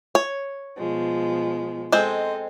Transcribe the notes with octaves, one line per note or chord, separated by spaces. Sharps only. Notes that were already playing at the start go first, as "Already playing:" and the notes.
C#5
B2 F3 G#3
G#3 C4 A4 C5 D#5